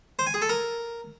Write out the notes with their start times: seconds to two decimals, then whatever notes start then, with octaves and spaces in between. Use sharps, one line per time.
0.19 C5
0.26 G#5
0.34 G#4
0.42 A4
0.49 A#4